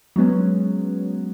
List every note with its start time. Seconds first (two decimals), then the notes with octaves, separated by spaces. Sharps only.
0.16 F#3 G#3 B3 C#4